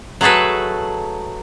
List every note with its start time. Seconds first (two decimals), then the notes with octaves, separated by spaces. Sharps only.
0.21 F#3 A3 G#4 A4 B4